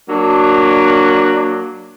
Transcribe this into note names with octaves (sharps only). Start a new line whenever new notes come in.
F#3 A#3 D4